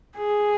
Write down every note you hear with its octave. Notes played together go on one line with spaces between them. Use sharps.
G#4